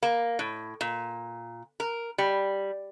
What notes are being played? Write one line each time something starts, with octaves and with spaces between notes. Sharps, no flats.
A#3
A2
A#2
A#4
G3